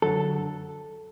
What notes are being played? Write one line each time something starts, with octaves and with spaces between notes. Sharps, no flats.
F#2 D3 F#3 A4